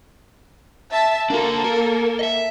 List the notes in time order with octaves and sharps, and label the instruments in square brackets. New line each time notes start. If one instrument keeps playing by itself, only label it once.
[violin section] E5 A5
[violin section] A#3 A4 [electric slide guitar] D4 F#4
[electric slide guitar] A#4
D#5 E5